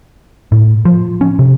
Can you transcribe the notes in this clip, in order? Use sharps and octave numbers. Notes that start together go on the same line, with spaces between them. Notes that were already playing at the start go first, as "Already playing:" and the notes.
A2
F3
C#4
C3